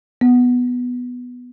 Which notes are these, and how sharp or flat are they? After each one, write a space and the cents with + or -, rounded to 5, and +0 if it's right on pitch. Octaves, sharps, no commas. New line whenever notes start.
B3 +0